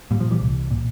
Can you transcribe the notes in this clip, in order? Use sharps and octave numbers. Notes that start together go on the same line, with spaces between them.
A#2 G3
F3
E3 G3
C2
A#2